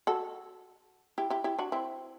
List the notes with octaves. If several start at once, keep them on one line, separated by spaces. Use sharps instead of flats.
F#4 A4
E4 G4
E4 G4
E4 G4
D4 F#4
C4 E4